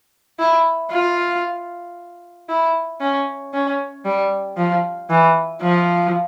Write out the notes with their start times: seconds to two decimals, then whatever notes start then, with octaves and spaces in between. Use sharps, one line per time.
0.39 E4
0.91 F4
2.49 E4
3.01 C#4
3.54 C#4
4.05 G3
4.57 F3
5.10 E3
5.61 F3